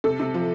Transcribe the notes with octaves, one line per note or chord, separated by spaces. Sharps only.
C3 A4
C3
F3